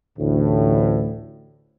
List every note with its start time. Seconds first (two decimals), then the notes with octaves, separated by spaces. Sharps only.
0.19 A1 D2 A2